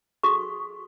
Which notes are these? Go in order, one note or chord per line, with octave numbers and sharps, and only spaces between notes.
F#4 G#4 A4 C#6